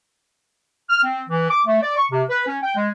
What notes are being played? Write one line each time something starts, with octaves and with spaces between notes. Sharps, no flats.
F6
C4
E3
D6
A3
D5
C#6
C3
B4
C#4
G5
G#3